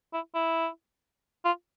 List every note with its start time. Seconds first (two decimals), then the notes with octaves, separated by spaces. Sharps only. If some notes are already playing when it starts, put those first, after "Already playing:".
0.13 E4
0.35 E4
1.45 F4